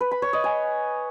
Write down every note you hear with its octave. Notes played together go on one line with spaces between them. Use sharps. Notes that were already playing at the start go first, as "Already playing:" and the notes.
B4
B5
C#5
D#5
G#5